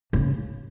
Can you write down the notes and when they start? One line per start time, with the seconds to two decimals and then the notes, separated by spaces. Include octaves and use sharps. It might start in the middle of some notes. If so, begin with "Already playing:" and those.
0.13 C#3